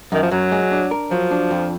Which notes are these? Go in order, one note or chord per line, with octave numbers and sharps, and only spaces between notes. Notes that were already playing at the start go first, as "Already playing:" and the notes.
F#2 D#3
F3
F#2 F#3
G#3
D4
A#4
F3 F#3
D4
F2